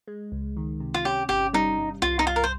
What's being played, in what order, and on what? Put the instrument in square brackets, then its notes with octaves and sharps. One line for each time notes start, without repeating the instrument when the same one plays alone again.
[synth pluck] G#3
C#2
D#3
C3
[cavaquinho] F4
[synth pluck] C#4 [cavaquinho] G4
[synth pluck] G1 [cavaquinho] G4
[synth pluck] G3 [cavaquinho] D#4
[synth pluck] G2
[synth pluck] C2 [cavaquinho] F4
[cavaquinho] D#4
[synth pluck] C2 [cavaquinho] F4
[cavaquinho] A#4
C5